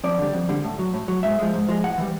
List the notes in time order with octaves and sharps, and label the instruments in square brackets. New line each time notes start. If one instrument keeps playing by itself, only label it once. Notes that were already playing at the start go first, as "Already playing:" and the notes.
[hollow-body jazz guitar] F2 D5
D3 G3
F2
D3 G3
A2
F#3
A2
F#3
G#2 E5
F3 G#3
G#2
F3 G#3
A2 F#5
E3 G3